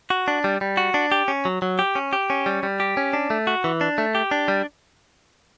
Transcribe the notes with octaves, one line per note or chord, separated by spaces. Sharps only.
F#4
D4
G3
G3
F#4
D4
G4
C#4
F#3
F#3
G4
C#4
G4
C#4
G3
G3
G4
C#4
D4
A3
F#4
E3
D4
A3
G4
D4
G3